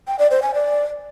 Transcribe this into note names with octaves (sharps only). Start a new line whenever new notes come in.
G5
D5
C5
G#5
D5